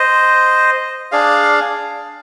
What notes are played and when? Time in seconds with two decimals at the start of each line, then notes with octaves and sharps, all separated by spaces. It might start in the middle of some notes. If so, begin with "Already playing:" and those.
Already playing: C5 D#5
1.12 D4 G#4 D5 F5